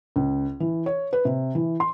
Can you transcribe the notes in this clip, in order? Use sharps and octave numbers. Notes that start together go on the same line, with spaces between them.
C#2
E3
C#5
B4
C3
E3
C6